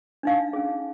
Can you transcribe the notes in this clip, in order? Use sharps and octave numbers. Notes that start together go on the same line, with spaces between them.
D4 D#4 F5
C#4 G#4